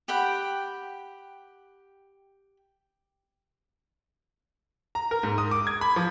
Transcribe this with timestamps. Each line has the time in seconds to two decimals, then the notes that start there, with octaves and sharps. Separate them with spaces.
0.08 G4 F#5 G5 B5
4.95 A#5
5.11 A#4
5.23 G#2
5.38 D#6
5.51 D6
5.67 G#6
5.81 B5
5.96 F3